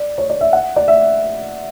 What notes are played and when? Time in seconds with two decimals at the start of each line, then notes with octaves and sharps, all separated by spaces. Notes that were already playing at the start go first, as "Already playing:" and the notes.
Already playing: D5
0.18 C#5
0.30 D5
0.41 E5
0.53 F#5
0.76 D5
0.88 E5